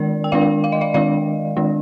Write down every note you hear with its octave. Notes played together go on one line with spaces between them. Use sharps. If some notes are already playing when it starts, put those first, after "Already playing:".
Already playing: D#3 G#3 D4 A#4 D5
G5
D#3 G#3 D4 D5 F5
F5
D#5
D5 F5
D#3 G#3 D4 D5 F5
D#3 G#3 D4